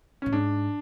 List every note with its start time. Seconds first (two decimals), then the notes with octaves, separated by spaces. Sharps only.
0.22 A2 C#4
0.32 G#2 D4